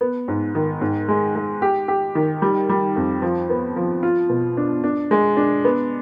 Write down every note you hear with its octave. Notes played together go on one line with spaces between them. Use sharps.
B3
G#2
D#3
G#2
G#3
G#3
G4
G4
D#3
G3
G3
F2
F3
B3
F3
F4
B2
D4
D4
G#3
D4
B3